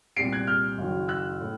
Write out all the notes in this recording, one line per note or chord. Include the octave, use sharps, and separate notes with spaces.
C2 A#2 G3 C4 C7 D7
F#6 G#6
F6 G6
F#1 F#2 D#3 F#3
E6 F#6
A2